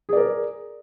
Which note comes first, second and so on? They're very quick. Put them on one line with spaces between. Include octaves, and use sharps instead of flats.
G#4 D5 A#4